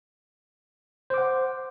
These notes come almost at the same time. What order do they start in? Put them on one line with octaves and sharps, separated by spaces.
C5 D6 F#5